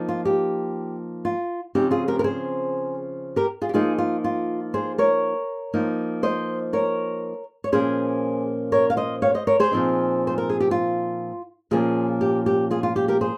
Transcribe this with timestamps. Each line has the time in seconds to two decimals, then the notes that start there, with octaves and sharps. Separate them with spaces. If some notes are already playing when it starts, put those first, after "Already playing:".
Already playing: F3 A#3 D#4
0.09 F4
0.25 G4
1.25 F4
1.75 C#3 F3 C4 D#4 G4
1.91 F4 G#4
2.08 G4 A#4
2.19 A#4
2.24 G#4 C5
3.36 G4 A#4
3.62 F4 G#4
3.69 G4
3.73 F3 A#3 D#4 F4 G#4
3.98 F4
4.24 F4
4.74 G#4 C5
4.98 A#4 C#5
5.74 F3 A#3 D#4
6.23 C5 D#5
6.73 A#4 C#5
7.64 C#5
7.72 A#2 F3 A#3 C#4 G#4 C5
8.72 A#4 C#5
8.90 F5
8.97 C5 D#5
9.22 C#5 F5
9.34 C5 D#5
9.47 A#4 C#5
9.60 G#4 C5
9.72 A#2 F3 C4 D#4
10.27 C5
10.38 A#4
10.49 G#4
10.60 G4
10.71 F4
11.71 A#2 F3 A#3 C#4 F4 G#4
12.21 G4
12.46 G4
12.71 F4 G#4
12.83 F4
12.96 G4
13.08 G4 A#4
13.21 G#4 C5